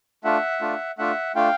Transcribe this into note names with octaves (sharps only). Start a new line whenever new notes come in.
A3 D4 F4 E5 F#5
A3 D4 F4
A3 D4 F4 E5 F#5
A3 D4 F4 F5 G5